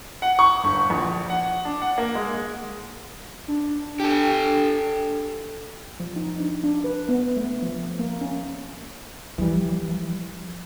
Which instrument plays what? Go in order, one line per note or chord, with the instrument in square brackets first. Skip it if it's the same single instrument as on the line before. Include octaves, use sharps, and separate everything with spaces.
[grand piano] F#5
C#6
G1
A#1
F#5
D4
F#5
A#3
G#3
[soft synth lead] D4
[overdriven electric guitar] G4 A4
[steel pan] F3
D#4
D4
D4
B4
B3
A3
F3
A#3
C#4
[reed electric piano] E3 G3 [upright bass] F3